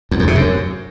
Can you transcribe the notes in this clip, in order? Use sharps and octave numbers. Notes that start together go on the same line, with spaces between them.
E2
F2
C3
F#2